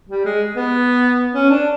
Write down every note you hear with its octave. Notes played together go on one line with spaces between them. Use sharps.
G3
G#3
B3
C#4
D4